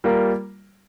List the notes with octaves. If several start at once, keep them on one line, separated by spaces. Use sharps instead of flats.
G3 A#3 F4 A#4